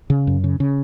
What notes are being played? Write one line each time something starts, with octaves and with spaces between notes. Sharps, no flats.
C#3
F#2
C#3
C#3